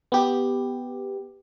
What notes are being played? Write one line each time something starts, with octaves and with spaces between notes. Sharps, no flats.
B3 G4